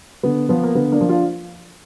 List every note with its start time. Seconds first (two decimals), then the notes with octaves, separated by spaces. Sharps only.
0.23 D3 B3
0.49 F3 B3
0.63 A#3
0.75 D3 B3
0.92 A#3 D4
1.01 F3
1.09 D4 F4